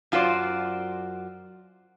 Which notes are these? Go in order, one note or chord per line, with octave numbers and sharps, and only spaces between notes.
F#2 F4 F#4 C5 D5